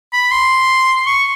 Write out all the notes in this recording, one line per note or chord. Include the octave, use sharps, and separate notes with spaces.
B5
C6
C#6